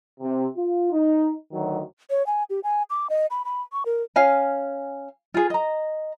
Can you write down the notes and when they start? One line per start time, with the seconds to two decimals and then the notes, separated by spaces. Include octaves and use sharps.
0.21 C3
0.56 F4
0.92 D#4
1.52 D2 D#3 F#3
2.10 C#5
2.27 G#5
2.50 G4
2.64 G#5
2.90 D6
3.10 D#5
3.31 B5
3.45 B5
3.73 C#6
3.86 A#4
4.16 C#4 F5 G#5
5.34 F4 G#4
5.50 D#5 A#5